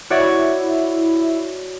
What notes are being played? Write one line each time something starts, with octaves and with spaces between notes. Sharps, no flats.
E4 F#4 C#5 D5